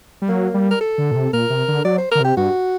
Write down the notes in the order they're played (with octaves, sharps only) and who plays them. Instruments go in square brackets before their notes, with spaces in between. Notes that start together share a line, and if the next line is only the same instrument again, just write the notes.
[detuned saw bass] G3
[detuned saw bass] F#3 [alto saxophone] A#3
[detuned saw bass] G3
[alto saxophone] A#4
A4
[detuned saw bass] D3
A#2
C3
[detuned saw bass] A#2 [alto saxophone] A#4
[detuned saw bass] C3
D3
[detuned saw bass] F#3 [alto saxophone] D5
[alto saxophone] C5
[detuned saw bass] D3 [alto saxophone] A#4
[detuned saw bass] C3 [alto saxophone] G4
[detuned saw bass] G2 [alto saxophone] F#4